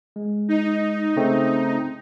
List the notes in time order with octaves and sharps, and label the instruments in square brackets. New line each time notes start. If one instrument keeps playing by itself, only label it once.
[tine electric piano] G#3
[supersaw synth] D#4
[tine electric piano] C#3 A3 C4